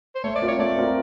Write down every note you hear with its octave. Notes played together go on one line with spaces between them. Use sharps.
C5
A3 C#5
D5
C4 F4 A#4
C#5
A3 D5
C4 F4 A#4